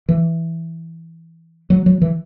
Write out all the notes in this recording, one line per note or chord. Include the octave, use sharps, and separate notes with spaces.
E3
F#3
F#3
E3